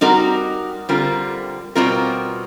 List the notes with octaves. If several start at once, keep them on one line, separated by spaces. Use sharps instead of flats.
G3 C4 D#4 F#4 A#4
D3 G3 C4 F4 A#4
B2 G3 C4 F4 A#4